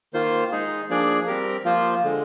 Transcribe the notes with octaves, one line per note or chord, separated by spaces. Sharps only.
D#3 A#3 F4 C5
G#3 D#4 G#4
F3 A#3 D4 G#4 D5
G3 C4 G4 A#4
F3 A#3 F4 C5
D3 G#3